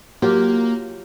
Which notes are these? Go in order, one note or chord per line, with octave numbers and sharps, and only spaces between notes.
F#3 A#3 F4 G4